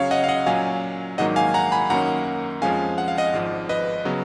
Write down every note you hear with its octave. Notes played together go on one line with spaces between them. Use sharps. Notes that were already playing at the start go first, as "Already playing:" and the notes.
Already playing: F#2 C#3 F#3 C#4 C#5 F5
D#5 F#5
F5
D#5 F#5
A#2 F#3 C#4 F5 G#5
A#1 G#2 D#3 F#3 A#3 D#5 F#5
F5 G#5
F#5 A#5
G#5 B5
F#2 D#3 A#3 C#4 F#5 A#5
F2 F3 G#3 C#4 F5 G#5
F#5
F5
D#5 F#5
G#1 G#2 F3
B4 D#5
C#3 F#3 B3